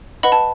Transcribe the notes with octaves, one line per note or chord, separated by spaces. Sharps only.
B4 D#5 F#5 B5
A5